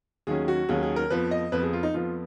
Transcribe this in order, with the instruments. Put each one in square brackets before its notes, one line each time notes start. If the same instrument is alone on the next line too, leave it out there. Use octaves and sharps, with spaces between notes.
[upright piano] D#2 D#3 F#3 C#4 G#4
F#4
D#2 D#3 F#3 C#4 G#4
G#4
A#4
F2 F3 B3 B4
D#5
F2 F3 B3 B4
G#4
F4
D#4
F2 F3 B3 F4